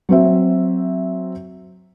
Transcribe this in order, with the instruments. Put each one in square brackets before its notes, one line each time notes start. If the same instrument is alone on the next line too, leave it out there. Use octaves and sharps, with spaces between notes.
[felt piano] F#3 C4 E5